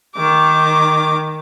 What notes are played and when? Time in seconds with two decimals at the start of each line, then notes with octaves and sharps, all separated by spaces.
0.17 D#3 D6